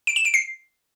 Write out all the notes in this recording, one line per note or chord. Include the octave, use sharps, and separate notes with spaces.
D7
E7
D7
C7